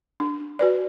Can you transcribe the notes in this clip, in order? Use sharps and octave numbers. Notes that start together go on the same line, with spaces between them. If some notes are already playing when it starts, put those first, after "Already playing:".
D4
F#4 B4 D5